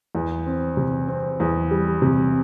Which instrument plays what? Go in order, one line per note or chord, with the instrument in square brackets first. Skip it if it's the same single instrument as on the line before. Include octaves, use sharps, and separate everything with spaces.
[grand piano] E2
C4
C3
C4
E2
G3
C3